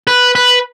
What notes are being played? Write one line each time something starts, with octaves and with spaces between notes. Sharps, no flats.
B4
B4